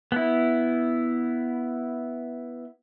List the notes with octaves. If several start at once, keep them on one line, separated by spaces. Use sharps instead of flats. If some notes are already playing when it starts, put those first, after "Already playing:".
B3 E4